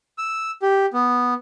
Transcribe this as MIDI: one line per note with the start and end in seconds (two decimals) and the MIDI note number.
0.18 0.51 88
0.62 0.86 67
0.93 1.34 59